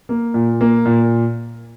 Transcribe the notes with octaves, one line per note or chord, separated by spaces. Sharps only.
A#3
A#2
A#3
A#2